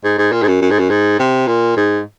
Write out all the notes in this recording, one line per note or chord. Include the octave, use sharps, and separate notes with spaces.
G#2
G#2
A#2
G#2
F#2
F#2
G#2
F#2
G#2
C3
A#2
G#2